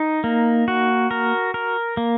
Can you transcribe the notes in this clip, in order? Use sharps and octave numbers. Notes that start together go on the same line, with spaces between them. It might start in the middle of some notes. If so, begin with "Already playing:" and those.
Already playing: D#4
A#3
F#4
A#4
A#4
A#3